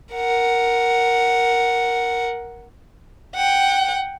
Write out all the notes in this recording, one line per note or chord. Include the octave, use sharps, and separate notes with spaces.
A#4 F#5
F#5 G5